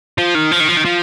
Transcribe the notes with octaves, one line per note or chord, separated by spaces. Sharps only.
F3
D#3
F3
D#3
F3
D#3
F3